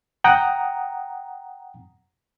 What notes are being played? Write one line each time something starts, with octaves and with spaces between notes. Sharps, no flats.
F#5 G5 A#5 D#6